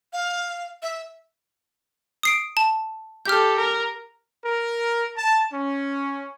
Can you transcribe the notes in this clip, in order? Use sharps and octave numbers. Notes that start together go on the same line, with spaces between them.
F5
E5
D#6 C7 D7
A5
G4 A4 F6 G6
A#4
A#4
A5
C#4